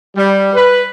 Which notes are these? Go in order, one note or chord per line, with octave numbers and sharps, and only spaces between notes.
G3
B4